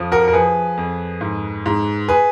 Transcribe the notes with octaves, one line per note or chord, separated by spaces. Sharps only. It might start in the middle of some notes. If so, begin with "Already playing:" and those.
Already playing: F2 F3
F#4 A#4
A#4
F3 G#4 B4
F2
G#2
G#2
G#4 B4